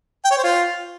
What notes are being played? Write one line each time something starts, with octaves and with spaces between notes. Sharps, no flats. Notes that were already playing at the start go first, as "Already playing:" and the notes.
G5
C#5
C5
F4